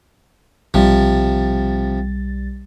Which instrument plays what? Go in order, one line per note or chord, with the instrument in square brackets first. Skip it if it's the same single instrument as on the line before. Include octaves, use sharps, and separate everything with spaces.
[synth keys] B1 G3 A6 [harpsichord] C3 F3